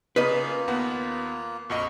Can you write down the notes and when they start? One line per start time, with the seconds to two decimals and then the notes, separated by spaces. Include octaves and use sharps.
0.16 C#3 A#3 F4 B4 D#5
0.68 D#2 B3 F#5
1.70 A#1 F2 F#4 D#5 C#6